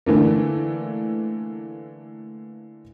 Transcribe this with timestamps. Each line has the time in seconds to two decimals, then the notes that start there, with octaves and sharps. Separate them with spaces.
0.06 D3 E3 A3 A#3